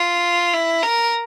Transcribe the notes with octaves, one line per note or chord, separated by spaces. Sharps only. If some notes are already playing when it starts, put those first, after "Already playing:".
Already playing: F4
E4
A#4